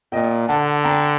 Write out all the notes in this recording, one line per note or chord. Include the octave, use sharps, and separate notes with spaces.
A#2 D#5 G5
D3 F#5 A5
G5 A#5